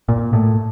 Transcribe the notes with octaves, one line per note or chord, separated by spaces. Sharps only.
A#2
A2